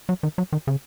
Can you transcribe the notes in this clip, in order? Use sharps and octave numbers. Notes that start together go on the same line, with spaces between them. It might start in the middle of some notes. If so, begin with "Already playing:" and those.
F#3
D#3
F#3
D#3
C#3